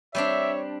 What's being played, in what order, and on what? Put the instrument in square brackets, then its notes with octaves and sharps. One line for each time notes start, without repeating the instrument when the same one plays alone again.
[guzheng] G3 C4 D4 [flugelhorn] C#5 [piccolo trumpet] E5